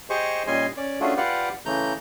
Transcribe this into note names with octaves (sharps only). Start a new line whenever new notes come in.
G4 G#4 C5 D#5 C#6
A#2 G3 C#4 D#5 G#5 C6
C#4 D5
A3 C#4 D4 F4 F#4 G#4
F4 G4 B4 D5 F5 F#5
C#3 E3 A3 A#5 G6